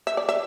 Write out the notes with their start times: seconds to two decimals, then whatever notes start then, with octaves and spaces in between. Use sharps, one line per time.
0.07 E5
0.17 D5
0.29 E5